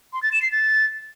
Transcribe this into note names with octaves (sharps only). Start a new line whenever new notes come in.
C6
A6
E7
C7
A6